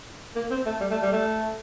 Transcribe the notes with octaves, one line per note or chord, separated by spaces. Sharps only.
A#3
C4
A3
G3
A3
G3
A3